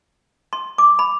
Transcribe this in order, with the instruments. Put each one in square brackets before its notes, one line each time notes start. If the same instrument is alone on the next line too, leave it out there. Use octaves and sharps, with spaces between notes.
[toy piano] C6
D6
B5